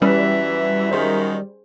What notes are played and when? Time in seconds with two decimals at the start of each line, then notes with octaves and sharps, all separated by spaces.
0.02 F#2 E3 G3 C#4 B4 E5
0.91 F#2 D#3 G#4 C5